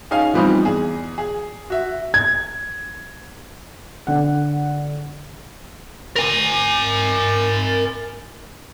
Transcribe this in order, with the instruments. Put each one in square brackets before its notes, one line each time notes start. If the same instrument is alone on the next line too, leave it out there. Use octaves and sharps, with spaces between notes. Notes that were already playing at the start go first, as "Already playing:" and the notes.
[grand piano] C#4 D#4 G#4 F5 G#5
E3 F3 G3 B3 C4 D#4
E2 G#4
G#4
F#4 E5
[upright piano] G#6
[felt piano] D3 F#5
[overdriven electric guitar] A#4 G#5